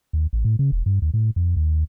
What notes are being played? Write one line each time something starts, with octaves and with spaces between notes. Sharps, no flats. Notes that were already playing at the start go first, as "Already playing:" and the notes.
D#2
A1
A2
C#3
E1
G2
D#2
A2
F2
D#2